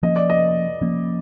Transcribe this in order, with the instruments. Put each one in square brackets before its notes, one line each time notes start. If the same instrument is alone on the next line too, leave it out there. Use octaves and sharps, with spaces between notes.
[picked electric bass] F3 A#3 C#4 [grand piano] D#5
[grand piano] D5
D#5
[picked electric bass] F3 A#3 C#4